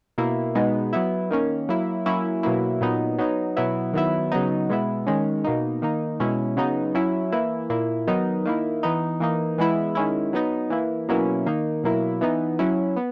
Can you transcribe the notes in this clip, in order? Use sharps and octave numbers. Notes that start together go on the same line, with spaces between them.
B2 A#3 E4
B2 G#3 B3 D#4
F#3 B3 E4
D#3 A#3 C#4
F#3 A#3 E4
F#3 A#3 C#4 E4
B2 F#3 A#3 E4
A#2 F#3 B3 D#4
F#3 B3 D#4
B2 F#3 B3 E4
D#3 F#3 B3 E4
C#3 F#3 B3 D#4
B2 G#3 B3 E4
D#3 G#3 C#4
B2 A#3 D#4
D#3 A#3 D#4
B2 G#3 C#4 E4
C#3 F#3 B3 D#4
F#3 C#4 E4
E3 A#3 E4
A#2 A#3 E4
D#3 F#3 B3 D#4
D#3 A#3 E4
E3 B3 D#4
E3 A#3 D#4
E3 G#3 B3 E4
D#3 G#3 C#4 E4
F#3 B3 D#4
E3 A#3 E4
B2 F#3 A#3 C#4 E4
D#3 A#3 D#4
B2 F#3 A#3 E4
E3 B3 D#4
F#3 C#4 E4
B3